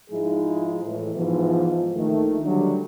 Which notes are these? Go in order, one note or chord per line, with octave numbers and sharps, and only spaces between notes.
G#2 F3 G#3 D#4 E4 G#4
A2 E3
G#2 B2 E3 F3
A#1 D#3 A3
D3 F#3 G3 D4